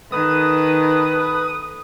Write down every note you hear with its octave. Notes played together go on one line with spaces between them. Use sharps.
D#3 A4 B4 D#6